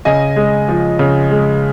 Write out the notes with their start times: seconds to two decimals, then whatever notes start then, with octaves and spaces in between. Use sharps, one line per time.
0.05 C#3 D#5 G#5
0.36 G#3
0.69 F3
0.99 C#3
1.31 G#3